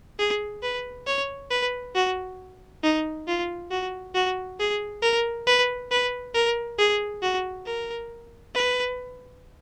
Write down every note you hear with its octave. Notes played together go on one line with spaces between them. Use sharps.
G#4
B4
C#5
B4
F#4
D#4
F4
F#4
F#4
G#4
A#4
B4
B4
A#4
G#4
F#4
A#4
B4